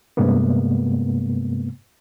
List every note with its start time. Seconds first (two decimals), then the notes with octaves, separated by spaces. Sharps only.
0.17 G2 C3 G#3 A#3 B3